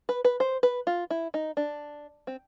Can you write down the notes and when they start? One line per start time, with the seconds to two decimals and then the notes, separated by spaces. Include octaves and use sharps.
0.09 B4
0.24 B4
0.40 C5
0.63 B4
0.87 F4
1.10 E4
1.34 D#4
1.57 D4
2.27 C4